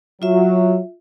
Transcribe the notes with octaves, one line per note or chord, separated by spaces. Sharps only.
F#3 F4 E5